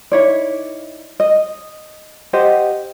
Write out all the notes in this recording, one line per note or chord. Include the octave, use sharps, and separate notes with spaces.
D#4 E4 C#5 D5
D#5
G4 C5 D#5 F#5